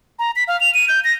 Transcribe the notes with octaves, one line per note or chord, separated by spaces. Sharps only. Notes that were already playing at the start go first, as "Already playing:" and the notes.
A#5
B6
F5
F7
D#7
G6
A#6